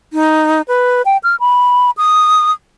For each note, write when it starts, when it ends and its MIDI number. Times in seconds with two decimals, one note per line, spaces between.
0.13 0.62 63
0.68 1.02 71
1.05 1.17 79
1.23 1.36 89
1.40 1.90 83
1.97 2.52 87